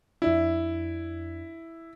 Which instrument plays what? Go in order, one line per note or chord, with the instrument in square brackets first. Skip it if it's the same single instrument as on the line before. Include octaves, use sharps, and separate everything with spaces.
[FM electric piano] F2 D4 [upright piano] E4